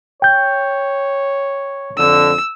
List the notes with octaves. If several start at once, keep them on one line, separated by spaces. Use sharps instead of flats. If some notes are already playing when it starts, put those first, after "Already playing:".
C#5 G5 G6
F2 D3 E6